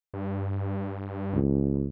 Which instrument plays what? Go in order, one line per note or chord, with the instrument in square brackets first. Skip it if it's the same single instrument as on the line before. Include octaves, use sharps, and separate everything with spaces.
[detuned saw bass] G2
[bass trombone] C#2